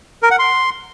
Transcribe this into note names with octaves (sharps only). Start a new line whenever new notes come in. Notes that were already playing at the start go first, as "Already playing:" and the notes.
A#4
F#5
C6